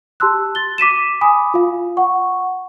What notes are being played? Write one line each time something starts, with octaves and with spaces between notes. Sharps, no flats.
G4 A5 C6 E6 F#6
A6 G7
D6 B6 D#7 E7
G#5 B5 D6 D#6
F4 F5
F#5 C#6